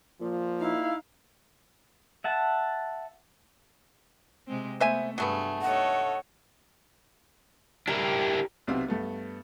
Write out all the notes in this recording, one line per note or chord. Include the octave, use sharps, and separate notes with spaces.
A#2 F3
D#4 E4 F5
E5 F#5 A5
C3 G#3 C4
A3 B3 C5 E5 G#5
G2 F#3 A3 B3 G#4
D#4 A4 C#5 F#5
D4 E4 G4 A#4
B1 C3 B3 C4 F5 E6
G2 A3 B3